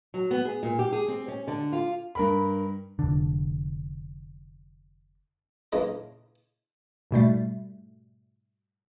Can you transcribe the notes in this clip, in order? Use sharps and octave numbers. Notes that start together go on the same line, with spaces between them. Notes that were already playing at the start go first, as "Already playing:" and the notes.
F#3
B3
G#4
A#2
G4
G#4
C4
C#4
D3
F4
G2 A#4 B5
F1 D3
A#1 E2 C#3 E3 A#3 D#5
G#2 B2 G3 A3